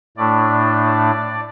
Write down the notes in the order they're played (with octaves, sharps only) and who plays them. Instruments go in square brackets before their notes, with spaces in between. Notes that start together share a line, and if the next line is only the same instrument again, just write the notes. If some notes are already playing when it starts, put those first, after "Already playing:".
[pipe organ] A2 A3 D4 D5